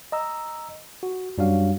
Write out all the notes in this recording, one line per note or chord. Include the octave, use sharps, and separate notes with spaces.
D#5 A#5 E6
F#4
F#2 G3 D4 F#4 C#5 F5